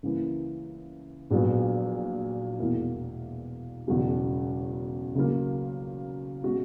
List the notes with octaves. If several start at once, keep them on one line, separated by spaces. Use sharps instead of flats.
C#2 C#3 E3 A#3
A#1 A#2 F#3 B3
E1 E2 B2 A#3 E4
E1 E2 C#3 F#3 C#4
C#2 C#3 F#3 A#3
B2 G#3 C#4 F#4